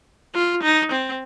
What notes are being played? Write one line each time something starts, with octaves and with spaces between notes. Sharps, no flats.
F4
D#4
C4